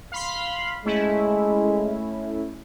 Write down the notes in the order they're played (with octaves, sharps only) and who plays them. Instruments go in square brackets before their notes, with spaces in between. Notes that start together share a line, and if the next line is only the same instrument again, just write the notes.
[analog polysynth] F5 B5 C6
[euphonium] G#3 [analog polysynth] A3 C#4 E4